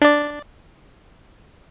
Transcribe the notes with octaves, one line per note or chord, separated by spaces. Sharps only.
D4 D5